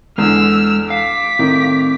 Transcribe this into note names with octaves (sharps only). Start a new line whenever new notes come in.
E2 D3 G#3 E6 F6
F5 D6 B6
A2 D#3 C4